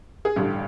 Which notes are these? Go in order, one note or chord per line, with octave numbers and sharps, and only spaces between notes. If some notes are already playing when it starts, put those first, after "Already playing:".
G#4
A1 G2 D3 G4